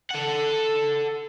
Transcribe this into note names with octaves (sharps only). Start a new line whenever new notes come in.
A4 F#5